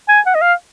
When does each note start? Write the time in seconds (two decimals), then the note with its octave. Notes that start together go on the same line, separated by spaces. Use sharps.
0.08 G#5
0.26 F#5
0.34 D#5
0.42 F5